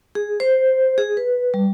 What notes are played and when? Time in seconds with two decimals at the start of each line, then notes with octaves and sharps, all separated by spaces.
0.15 G#4
0.40 C5
0.98 G#4
1.17 B4
1.54 G3